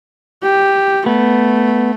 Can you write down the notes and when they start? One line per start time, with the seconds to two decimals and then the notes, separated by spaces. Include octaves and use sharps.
0.43 G4
1.06 A3 B3